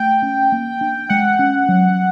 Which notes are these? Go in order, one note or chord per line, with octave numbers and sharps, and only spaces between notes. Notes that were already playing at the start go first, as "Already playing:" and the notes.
Already playing: A3 G5
C#4
A#3
D4
G#3 F#5
C#4
F#3